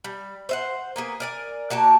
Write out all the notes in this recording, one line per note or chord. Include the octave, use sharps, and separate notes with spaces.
G3
C5 E5 F#5
A#3 B3 G#4
A#4 D5 G#5
A#3 F#4 G4 A5